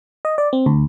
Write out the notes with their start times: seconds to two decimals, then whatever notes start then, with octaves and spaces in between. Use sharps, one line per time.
0.25 D#5
0.38 D5
0.53 C4
0.66 D2